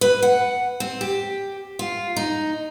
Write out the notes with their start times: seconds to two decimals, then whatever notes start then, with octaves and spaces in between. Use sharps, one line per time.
0.01 B4
0.23 F#5
0.80 C4
1.01 G4
1.79 F4
2.16 D#4